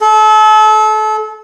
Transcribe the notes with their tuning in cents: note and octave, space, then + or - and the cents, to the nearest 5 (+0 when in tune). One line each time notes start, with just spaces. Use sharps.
A4 -35